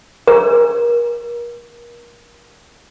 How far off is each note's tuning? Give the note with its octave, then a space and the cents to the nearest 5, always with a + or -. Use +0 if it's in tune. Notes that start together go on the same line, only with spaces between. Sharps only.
A#4 +30